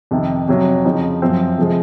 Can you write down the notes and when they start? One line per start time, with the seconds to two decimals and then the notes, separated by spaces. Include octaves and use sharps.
0.11 F2 C3 D#3
0.48 F2 C3 F#3
0.85 F2 C#3 F3 C4 D#4
1.22 F#2 F3 C4
1.58 C3 F3 G#3